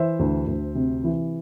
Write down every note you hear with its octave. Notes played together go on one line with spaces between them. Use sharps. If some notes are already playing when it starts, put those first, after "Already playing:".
Already playing: E3 C5 E5
D2
D2
C3
E3